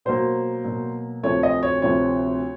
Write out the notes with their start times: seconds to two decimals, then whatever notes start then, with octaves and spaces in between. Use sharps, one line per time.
0.05 B2 F#3 A#3 C5
0.64 B2 F#3 A#3
1.23 D2 C3 F3 A3 C#5
1.43 D#5
1.63 C#5
1.82 D2 C3 F3 A3 C#5